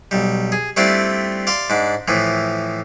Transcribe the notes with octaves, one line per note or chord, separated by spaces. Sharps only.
B1 G3
G#4
G3 A3 C4 D4 E4 F4
D5 F5 C6
G#2 D4
A2 E3 F3